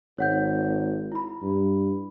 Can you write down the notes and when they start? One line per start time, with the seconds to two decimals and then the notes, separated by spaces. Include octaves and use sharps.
0.18 G#1 C#5 F#5 G6
1.12 E4 B5
1.42 G2